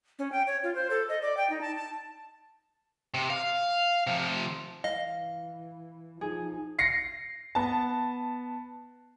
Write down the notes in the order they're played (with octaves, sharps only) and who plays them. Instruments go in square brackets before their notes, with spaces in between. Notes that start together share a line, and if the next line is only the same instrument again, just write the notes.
[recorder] C#4
G5
C#5
F4
C5
A4
D#5
D5
G5
D#4
A5
A5
[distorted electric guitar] C3
F5
C3 F3
[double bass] E3 [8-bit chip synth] D#5 [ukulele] F5
[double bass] F3 D#4 [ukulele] G#4
[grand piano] A#6 C7 C#7
B3 A5